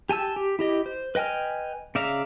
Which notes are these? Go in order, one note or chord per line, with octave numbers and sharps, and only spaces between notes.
G4 G#5 A5 E6
G4
E4 G4 D#5
C5
B4 D#5 G5 G#5 F6
C#3 D5 E5 F5 A#5